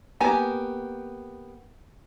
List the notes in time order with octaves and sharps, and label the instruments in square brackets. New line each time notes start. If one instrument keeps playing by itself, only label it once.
[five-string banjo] A#3 B3 G4 G#5